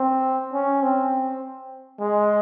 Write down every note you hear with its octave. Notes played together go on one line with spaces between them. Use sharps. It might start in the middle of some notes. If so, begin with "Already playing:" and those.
Already playing: C4
C#4
C4
G#3